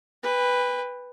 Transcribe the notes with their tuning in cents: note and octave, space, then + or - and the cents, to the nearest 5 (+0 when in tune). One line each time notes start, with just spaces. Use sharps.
B4 +0 G5 +40